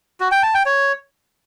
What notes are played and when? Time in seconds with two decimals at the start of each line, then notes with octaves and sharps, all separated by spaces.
0.20 F#4
0.32 G5
0.43 A5
0.54 G5
0.66 C#5